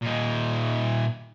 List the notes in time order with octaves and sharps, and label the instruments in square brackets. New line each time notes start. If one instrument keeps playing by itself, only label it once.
[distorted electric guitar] A#2 D#4